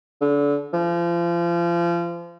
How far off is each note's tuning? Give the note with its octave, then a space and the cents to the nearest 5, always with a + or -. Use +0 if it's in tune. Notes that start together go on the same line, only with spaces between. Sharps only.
D3 -30
F3 -30